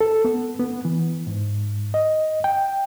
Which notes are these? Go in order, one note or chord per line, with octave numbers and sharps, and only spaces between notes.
A4
B3
B3
E3
G#2
D#5
G5